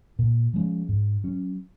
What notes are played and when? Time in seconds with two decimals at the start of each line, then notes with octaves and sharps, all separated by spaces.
0.19 A#2
0.54 F3 G#3 C#4
0.89 G#2
1.24 F#3 C#4